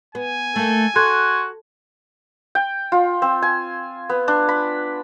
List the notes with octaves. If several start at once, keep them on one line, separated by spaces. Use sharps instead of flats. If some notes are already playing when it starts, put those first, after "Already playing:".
B3 G#5
A3 A#3 A4
F#4 A4 C6 F#6 G#6
G5
F4
C4
G#5
B3
D4
B5